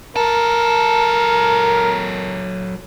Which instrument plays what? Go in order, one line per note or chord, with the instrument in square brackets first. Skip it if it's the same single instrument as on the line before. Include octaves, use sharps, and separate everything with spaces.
[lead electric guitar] F#3 A4 [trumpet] A#4